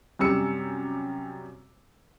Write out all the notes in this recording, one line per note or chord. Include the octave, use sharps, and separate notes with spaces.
F#2 C3 G3 E6 C#7